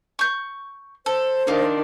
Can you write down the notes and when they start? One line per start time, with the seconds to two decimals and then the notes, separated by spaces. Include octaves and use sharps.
0.19 C#6 G6
1.06 A4 C5
1.47 D#3 D4 D#4 F4